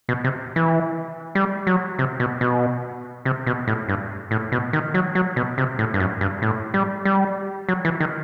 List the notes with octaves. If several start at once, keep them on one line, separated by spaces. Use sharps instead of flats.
B2
C3
E3
G3
F#3
C3
B2
B2
C3
B2
A2
G2
A2
B2
D#3
F#3
F#3
B2
C3
A2
G2
F#2
G2
A2
G3
G3
F#3
E3
D#3